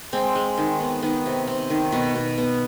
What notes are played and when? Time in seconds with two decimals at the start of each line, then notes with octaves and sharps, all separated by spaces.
0.13 G#3 C4
0.35 G#3
0.57 D#3
0.80 B3
1.02 D#3 B3
1.26 C3
1.48 C3
1.70 D#3
1.92 B2 B3
2.15 B2
2.38 B3